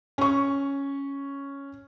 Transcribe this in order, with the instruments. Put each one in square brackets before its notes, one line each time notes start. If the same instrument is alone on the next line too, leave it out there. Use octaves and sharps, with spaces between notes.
[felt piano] C#4 C#6